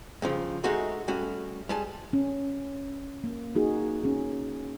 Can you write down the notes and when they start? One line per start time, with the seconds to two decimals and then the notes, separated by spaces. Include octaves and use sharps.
0.22 G2 C#3 F3
0.64 G#3 A3 D#4 F#4 G#4
1.08 G3 A3 C#4 F#4
1.69 G3 G#3 G#5 A5
2.13 C#4
3.24 A#3
3.55 A#3 D#4 F#4 G#4
4.04 C#4 G#4